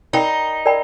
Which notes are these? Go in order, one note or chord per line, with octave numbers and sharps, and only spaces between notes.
D#4 A#4 D5 G5 B5
A#4 D5 G5 B5